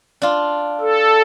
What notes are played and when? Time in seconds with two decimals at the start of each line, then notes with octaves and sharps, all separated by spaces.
0.22 D4 F4
0.80 A4